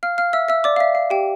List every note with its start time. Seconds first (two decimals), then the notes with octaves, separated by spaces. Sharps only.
0.03 F5 F6
0.18 F5 F6
0.33 E5 E6
0.48 E5 E6
0.64 D5 D6
0.76 F5
0.80 E5
0.95 F5
1.10 G4 G5